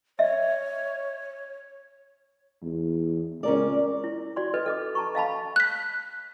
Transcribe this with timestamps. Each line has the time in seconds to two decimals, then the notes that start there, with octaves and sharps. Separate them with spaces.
0.19 C#5 D#5 E5
2.62 E2
3.43 C#2 C#4 A#4 D5
4.04 E4
4.36 F#4 D5 C6
4.54 A4 B4 D#5
4.66 A4 D#5 D6
4.95 A5 A#5 C#6
5.15 D#5 F5 A5 B5
5.56 F#6 B6